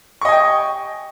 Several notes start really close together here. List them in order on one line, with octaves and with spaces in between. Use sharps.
C#6 D#5 G#5 G5